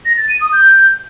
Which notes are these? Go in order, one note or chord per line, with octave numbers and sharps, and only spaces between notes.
A#6
A6
D#7
D#6
G6